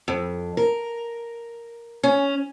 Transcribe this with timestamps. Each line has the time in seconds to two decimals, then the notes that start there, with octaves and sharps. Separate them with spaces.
0.08 F2
0.57 A#4
2.03 C#4